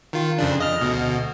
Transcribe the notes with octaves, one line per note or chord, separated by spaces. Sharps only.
D#3 F4
F2 C#3 D4
D#5 F6
D2 B2